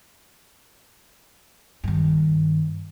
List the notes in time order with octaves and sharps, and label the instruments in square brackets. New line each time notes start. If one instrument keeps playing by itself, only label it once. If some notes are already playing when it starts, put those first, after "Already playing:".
[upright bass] G2 D#3